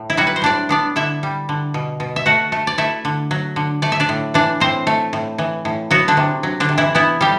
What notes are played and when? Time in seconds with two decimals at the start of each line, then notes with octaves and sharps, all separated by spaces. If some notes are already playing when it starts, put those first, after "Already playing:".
Already playing: A2
0.10 E4
0.17 F#3 G3 F#4
0.27 B4
0.36 C5
0.42 A2 D4 D5
0.69 B3 D4 D5
0.96 D3 E4 E5
1.23 G3
1.49 D3
1.74 B2
2.00 B2
2.16 E5
2.26 A3 F#4 F#5
2.52 A3
2.67 D5
2.78 A3 E4 E5
3.05 D3
3.31 F#3
3.56 D3
3.82 A3 D5
3.92 E5
4.00 D4 D5
4.09 A2
4.34 E3 D4 D5
4.60 A2 C4 C5
4.87 A3
5.13 A2
5.38 E3
5.65 A2
5.91 F#3 B3 F#4
6.08 D3 D4
6.17 C3
6.43 F#3
6.60 D3 D4
6.69 C3
6.78 E3 E4
6.95 E3 B3 E4
7.21 A2 G3 G4